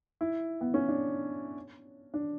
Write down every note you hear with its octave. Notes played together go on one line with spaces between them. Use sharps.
E4
B3
C#4
D4
D4